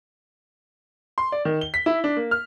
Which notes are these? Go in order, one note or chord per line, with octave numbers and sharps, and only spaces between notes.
C6
D5
D#3
G7
B6
E4
D4
A#3
F6